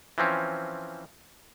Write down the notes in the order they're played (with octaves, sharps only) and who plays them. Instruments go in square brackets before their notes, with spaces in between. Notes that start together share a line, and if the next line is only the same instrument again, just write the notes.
[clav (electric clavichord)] E3 F3 C4 C#4